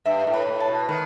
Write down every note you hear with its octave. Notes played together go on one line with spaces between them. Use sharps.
G2 E5
A2
B4
A2
A5
B2
D#3 B4